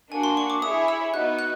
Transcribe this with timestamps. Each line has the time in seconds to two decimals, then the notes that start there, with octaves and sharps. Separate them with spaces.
0.11 A#3 D4 F#4 G#5
0.23 C6
0.37 C#6
0.50 D6
0.62 E4 G#4 C#5 E5 D#6
0.88 E6
1.14 B3 D#4 F#4 F#6
1.39 F#6